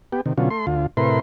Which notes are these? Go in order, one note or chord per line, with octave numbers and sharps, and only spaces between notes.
B3 G4
C3 D#3
B2 D3 F#3 C#4 F4
A3 C6
D2 F4
A2 C3 E4 A#4 B4 C6